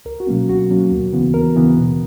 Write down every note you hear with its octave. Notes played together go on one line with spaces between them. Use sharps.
C#2 A#4
F#4
B2 F#3 A#3 C#4
C#2 F#4
B2 F#3 A#3 C#4
D#2
C#3 E3 B3
D#2 A#4
C#3 E3 B3
B2